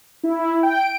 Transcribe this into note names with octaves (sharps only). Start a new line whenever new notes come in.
E4
G5
D7